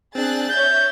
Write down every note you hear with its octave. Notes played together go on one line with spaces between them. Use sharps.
C4 D4 G#4 F#6 A6
C#5 E5 G6 A6